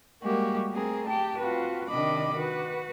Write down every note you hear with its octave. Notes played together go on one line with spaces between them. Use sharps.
G3 G#3 A#3 F#4 G4
A3 C4 G#4 A#4
G4 G5 A5
C4 F4 F#4 B4
C3 D#3 D4 D#5 B5 D6
F#4 B4